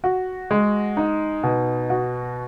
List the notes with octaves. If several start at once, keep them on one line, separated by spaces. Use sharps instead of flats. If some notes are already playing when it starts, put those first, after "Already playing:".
F#4
G#3
D#4
B2
F#4